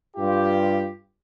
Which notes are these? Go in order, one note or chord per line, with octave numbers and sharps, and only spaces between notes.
G2 F4 G4